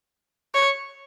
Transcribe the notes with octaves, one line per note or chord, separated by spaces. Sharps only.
C#5